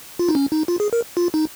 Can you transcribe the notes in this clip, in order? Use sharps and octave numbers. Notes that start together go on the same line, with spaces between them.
F4
D#4
C#4
D#4
F4
G#4
A#4
F4
D#4